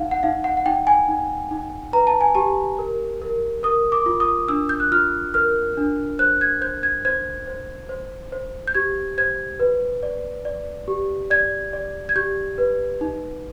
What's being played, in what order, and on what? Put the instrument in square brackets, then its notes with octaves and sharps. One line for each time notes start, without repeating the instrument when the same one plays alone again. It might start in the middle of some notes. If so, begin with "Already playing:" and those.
Already playing: [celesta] D#4 F5 F#5
F#5
D#4 F5
F#5
F#5
D#4 G5
G#5
D#4
D#4
B4 A#5
A5
G#5
G4 A5
A#4
A#4
A#4 D#6
D6
F4
D#6
D4 E6
G6
F#6
F4 F6
A#4 F6
D4
C5 F#6
G#6
C5 G6
G#6
C5 G#6
C5
C5
C5
G6
G4 G#6
C5 G#6
B4
D5
D5
G4
D5 G#6
D5
G#6
G4 G6
B4
D#4